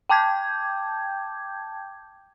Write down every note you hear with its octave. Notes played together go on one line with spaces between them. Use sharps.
G5 A5 D6 G6 G#6